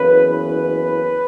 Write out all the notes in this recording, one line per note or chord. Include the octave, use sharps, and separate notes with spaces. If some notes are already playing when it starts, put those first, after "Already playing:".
Already playing: F#1 E2 C#3 B4
B4